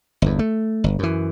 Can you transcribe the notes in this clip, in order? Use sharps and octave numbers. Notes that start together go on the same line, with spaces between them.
G1 E2
A3
G1
F#2 E3